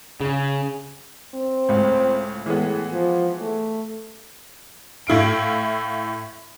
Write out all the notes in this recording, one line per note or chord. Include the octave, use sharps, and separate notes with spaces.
C#3
C4
C#2 A2
A2 E3 G#3 B3
F3
A3
A2 E4 F5 D7